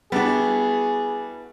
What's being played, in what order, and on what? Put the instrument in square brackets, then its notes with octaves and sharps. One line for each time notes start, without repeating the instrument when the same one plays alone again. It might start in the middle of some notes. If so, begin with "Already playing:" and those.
[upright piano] G3 D4 [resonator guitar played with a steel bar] B3 E4 F#4 [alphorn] G#4